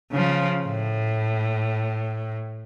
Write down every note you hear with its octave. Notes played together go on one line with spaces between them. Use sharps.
C#3 F3
A2